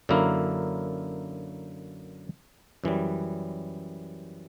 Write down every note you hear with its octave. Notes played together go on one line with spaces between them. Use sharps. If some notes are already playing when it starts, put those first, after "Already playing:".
F#2 D3 A#3 E4 A#4
F#2 E3 G3